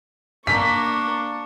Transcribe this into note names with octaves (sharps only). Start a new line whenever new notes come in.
A#3 D4 C#6 B6